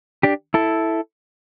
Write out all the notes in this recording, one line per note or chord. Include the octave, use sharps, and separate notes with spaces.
D4 G4
E4 A4